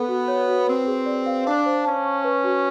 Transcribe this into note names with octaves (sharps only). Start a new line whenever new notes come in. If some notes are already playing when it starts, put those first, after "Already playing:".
Already playing: B3 A4
F#4
C#5
F#4
C4 B4
G#4
D5
F5
D4 F5
C5
C#4 A5
C#6
B4
F#4